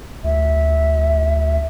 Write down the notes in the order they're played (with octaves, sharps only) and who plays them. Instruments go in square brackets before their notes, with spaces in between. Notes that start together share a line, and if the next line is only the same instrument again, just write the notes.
[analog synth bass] D2 [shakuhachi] E5